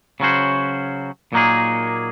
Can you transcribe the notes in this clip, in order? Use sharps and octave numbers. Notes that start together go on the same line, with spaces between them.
C#3 F#3 C#4 F#4 C5
A#2 F#3 A#3 D#4 G#4